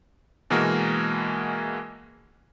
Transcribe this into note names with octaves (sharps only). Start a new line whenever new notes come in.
B2 E3 G#3 A#3 F#4 A#4